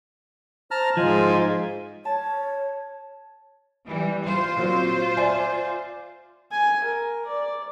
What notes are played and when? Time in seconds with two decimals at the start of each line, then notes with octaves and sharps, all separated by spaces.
0.71 C5 A5 A#5 F6
0.97 G#2 F3 F4 D#5 G#5
2.05 C#5 A5
3.86 E3 G3
4.24 F4 C5
4.57 A#2 F#3 C4
5.17 D5 E5 G#5
6.52 G#5
6.85 A#4
7.27 D5